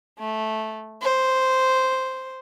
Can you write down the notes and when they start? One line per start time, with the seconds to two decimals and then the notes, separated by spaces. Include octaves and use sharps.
0.19 A3
1.02 C5